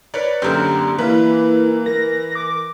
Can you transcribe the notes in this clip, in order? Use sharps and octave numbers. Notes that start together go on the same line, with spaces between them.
A#4 B4 C#5 D5
F#2 D3 A#3 C4 G4
E3 A#3 E4 B4
A#4 A#6
D6